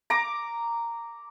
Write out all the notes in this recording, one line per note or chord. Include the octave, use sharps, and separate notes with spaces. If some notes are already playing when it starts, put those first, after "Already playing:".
A#5 D6